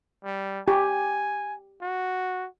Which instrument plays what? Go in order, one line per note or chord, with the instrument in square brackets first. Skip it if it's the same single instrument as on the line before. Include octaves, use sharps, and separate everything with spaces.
[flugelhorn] G3
[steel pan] G4 [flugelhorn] G#5
[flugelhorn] F#4